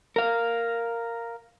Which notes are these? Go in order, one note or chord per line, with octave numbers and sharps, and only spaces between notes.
A#4 F5